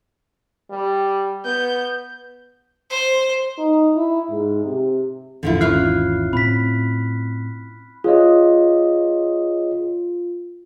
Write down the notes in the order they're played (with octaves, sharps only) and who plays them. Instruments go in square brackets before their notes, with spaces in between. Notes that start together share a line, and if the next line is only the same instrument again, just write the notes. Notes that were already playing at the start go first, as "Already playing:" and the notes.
[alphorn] G3
[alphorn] B3 [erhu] G6
[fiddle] C5
[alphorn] D#4
E4
G#2
C3
[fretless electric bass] G#1 E2 [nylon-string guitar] D3 F3 E4
[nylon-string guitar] C#4 E4 F4 [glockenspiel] F6 F#6 C7
[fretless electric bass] A2 C4 [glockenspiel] B5 B6
[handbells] F4 [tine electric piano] G#4 C#5 D#5